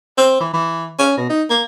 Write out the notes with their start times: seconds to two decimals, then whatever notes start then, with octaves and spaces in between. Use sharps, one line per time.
0.18 C4
0.40 E3
0.54 E3
0.99 C#4
1.17 B2
1.30 D#4
1.50 A#3